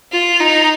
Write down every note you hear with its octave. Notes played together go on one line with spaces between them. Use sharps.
F4
D#4